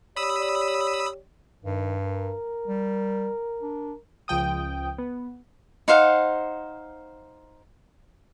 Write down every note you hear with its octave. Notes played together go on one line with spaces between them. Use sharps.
G4 C#5 D5 B5 D#6 E6
G2 D#3
A#4
G3
D4
C#2 F3 G5 D#6
B3
D#4 C5 F5 F#5